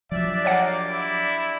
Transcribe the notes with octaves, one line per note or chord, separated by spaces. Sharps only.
F3 F#3 D4 G4 D5 E5
A#3 C#5 D#5 F#5
E4